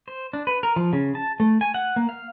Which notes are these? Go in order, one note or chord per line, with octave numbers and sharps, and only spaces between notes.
C5
D4
B4
A#4
F3
C#3
A5
A3
G#5
F#5
A#3
F5